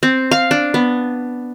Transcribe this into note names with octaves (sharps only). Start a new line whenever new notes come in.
C4
F5
D4
B3